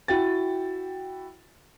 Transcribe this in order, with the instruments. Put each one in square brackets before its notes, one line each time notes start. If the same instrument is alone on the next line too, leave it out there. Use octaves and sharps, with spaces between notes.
[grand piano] E4 F#4 G5 A6